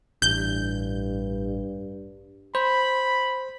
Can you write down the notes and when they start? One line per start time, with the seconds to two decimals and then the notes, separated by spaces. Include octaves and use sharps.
0.22 A1 G2 G6
2.55 C5 B5